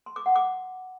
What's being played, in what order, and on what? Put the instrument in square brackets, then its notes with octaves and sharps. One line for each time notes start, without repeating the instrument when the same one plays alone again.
[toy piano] C6
D6
F#5
D6